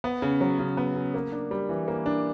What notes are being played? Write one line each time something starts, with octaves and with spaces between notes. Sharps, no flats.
B3
C#3
F#3
C#3
B3
C#3
A#3
D4
G3
E3
A#3
D4